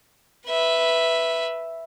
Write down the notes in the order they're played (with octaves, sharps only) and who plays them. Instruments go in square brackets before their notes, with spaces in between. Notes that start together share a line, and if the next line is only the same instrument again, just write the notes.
[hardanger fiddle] B4 E5